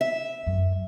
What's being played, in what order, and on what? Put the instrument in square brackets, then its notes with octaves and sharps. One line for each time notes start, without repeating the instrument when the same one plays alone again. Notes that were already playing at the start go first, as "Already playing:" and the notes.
[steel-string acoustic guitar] E5
[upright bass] F#2